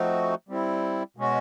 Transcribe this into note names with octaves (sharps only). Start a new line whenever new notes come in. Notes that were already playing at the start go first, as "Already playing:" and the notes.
Already playing: F3 A3 C4 D#4 F#4
G3 C4 E4
B2 G#3 C#4 F#4